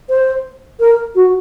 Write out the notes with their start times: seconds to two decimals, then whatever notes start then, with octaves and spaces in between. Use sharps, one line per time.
0.09 C5
0.80 A#4
1.15 F#4